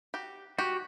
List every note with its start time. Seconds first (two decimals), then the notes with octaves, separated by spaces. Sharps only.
0.14 F#4 G4
0.58 F#4 G4